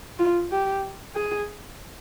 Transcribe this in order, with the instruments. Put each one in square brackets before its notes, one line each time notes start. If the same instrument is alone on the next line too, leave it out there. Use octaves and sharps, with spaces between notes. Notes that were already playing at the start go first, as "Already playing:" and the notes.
[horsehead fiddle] F4
G4
G#4